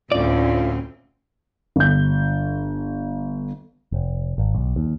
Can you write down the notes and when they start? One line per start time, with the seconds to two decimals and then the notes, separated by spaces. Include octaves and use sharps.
0.12 D2 A2 C4 C#4 F4 D5
1.76 G1 G6
3.92 F1
4.38 G#1
4.55 B1
4.76 D#2